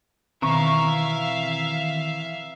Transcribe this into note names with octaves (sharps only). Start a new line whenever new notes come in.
B2 D#3 E3 C4 E5 F5 A#5 C#6